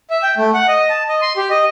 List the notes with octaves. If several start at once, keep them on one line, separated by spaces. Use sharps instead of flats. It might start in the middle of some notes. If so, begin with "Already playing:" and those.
E5
G5
A3
F#5
D#5
A5
D#5
C6
G4
D#5